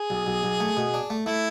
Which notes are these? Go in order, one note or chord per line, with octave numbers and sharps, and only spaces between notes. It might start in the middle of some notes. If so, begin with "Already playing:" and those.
Already playing: G#4
B1
B1
B1
A3
B2
D4
A3
A3 E4